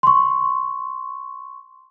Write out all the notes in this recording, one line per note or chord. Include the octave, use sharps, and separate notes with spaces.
C6 C#6